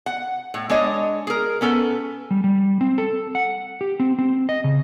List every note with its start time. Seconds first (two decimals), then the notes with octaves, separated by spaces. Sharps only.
0.06 F#5
0.54 A2
0.70 G#3 D4 C#5 D#5
1.27 G#4 A#4
1.61 B3 C#4 A4 B4
2.31 G3
2.44 G3
2.81 C4
2.98 A4
3.35 F#5
3.81 G4
4.00 C4
4.19 C4
4.49 D#5
4.64 C#3